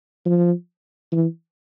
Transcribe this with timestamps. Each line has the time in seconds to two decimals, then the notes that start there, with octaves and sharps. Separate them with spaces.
0.25 F3
1.12 E3